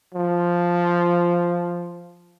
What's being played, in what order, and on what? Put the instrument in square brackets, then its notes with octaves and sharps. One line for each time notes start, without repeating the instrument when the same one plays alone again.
[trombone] F3